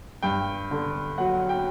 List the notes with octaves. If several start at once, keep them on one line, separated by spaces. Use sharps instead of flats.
G2 G5
D3
F#3 F#5
G5